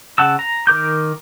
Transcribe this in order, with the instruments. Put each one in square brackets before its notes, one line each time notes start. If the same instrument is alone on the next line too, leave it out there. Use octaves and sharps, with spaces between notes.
[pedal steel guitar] C#3 F#5 A5 E6
A#5
D#3 A#4 D6 G6